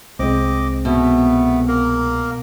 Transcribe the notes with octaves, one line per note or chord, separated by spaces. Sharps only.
C2 G#3 C4 D#5 D6
B2 A3 B3
A#3 A#4